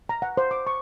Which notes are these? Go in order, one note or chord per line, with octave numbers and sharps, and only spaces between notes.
A#5
F#5
C5
D6
C#6